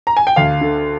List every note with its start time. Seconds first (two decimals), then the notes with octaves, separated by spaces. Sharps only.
0.07 A#5
0.17 G#5
0.27 G5
0.36 D2 F5
0.61 D3